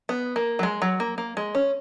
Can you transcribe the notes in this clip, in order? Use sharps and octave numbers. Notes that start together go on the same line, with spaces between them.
B3
A#3
F#3
G#3
F#3
A#3
A#3
G#3
C#4